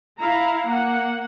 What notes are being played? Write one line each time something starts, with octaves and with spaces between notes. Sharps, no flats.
E4 F5 A#5
A#3 F#5